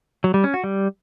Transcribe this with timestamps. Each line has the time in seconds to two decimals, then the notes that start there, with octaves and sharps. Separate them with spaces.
0.24 F#3
0.34 G3
0.44 C#4
0.54 F#4
0.64 G3